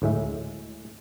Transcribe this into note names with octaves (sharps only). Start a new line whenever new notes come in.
D2 A2 G#3 E5